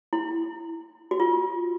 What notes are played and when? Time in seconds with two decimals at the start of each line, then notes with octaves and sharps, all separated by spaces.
0.13 E4
1.11 F#4
1.20 F4